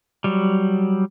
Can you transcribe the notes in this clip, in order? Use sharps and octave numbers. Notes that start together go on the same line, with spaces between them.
F#3 G3